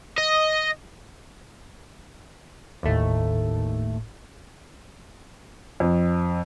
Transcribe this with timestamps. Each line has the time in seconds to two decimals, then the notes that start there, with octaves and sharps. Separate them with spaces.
0.18 D#5
2.83 G1 D#2 A2 A3
5.80 F2